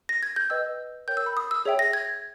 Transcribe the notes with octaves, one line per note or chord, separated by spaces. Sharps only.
A#6
G#6
G6
B4 D#5 G5 E6
A#4 C#5 G5 G6
E6
B5
D#6
E6
G#4 C#5 E5 G5
A#6
G#6